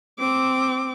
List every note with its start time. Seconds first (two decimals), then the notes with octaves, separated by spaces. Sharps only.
0.20 C4 D6